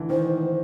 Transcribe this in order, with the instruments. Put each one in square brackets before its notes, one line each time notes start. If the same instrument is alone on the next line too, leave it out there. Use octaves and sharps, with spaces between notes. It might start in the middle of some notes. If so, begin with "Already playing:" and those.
Already playing: [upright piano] D3 E3
[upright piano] D#3 [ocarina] C5